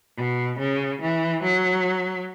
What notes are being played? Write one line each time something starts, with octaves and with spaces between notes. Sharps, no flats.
B2
C#3
E3
F#3